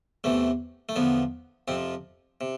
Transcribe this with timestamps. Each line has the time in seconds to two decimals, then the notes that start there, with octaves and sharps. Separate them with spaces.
0.24 E2 C3 E3 A3
0.89 A3
0.96 E2 D3 F3 B3
1.68 F2 C3 F3 C4
2.41 C3